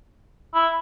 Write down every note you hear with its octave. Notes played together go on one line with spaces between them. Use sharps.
E4